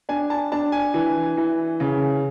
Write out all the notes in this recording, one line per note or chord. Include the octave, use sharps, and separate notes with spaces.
D4 G#5
A5
D4 A5
G#5
E3
E3
C#3